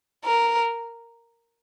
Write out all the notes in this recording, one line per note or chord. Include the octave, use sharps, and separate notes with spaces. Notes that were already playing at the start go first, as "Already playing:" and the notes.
A#4